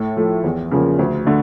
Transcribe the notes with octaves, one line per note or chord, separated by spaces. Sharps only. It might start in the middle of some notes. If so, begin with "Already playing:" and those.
Already playing: A2 A4
F3 A3
E2
C#3 F3 A#3
D2
D3 A3